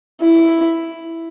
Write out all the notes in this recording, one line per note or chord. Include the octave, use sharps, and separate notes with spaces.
E4